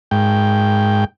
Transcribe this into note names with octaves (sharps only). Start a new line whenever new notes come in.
G#2 G5